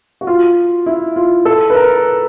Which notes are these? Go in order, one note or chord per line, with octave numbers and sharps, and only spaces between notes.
F#4
F4
E4
F4
A4
B4
A#4